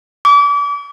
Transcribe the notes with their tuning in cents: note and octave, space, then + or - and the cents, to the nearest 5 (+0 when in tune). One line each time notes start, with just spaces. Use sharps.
D6 -35